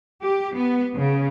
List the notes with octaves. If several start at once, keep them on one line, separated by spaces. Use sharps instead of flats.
G4
B3
C#3